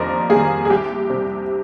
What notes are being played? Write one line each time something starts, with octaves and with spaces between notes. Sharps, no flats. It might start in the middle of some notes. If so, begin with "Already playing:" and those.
Already playing: F2 D#3 G3 A#3 A#4 C5 D5 D#5
D#3 G3 A#3 G#4
G#4
C2 G4
C3 G3